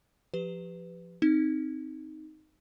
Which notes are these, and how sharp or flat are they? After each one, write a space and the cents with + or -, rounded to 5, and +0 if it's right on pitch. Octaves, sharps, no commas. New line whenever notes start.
F3 +0 G4 +0 B4 +15
C4 +0 D#4 +0